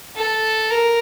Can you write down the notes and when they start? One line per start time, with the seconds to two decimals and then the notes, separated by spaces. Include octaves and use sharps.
0.17 A4
0.71 A#4